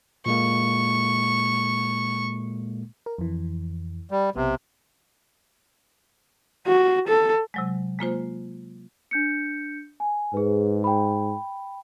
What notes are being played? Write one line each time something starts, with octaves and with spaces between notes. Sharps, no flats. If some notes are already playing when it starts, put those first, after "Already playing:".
A#2 G#3 A#3 C#6
A#4
F2 E3
G3
B1 C3 B3
F#4
A4
C3 F#3 G#3
G#3 A#3 F4 C5
D4 G6 C#7
G#5
G#2 G#4 B4
G5 B5